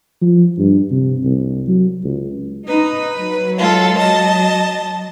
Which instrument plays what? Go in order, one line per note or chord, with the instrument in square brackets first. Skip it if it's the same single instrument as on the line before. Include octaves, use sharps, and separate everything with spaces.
[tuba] F3
G2
C3
C2
F#3
C#2
[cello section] D#4 [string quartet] B4
[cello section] F#3
[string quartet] G#3 F4 A4
D#5 A5